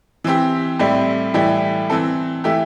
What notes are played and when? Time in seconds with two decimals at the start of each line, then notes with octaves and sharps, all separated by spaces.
0.24 E3 C4 G4
0.79 A2 G3 C4 E4 G4
1.34 A2 E3 G3 E4 G4
1.90 E3 C4 A4
2.44 E3 A3 E4 G4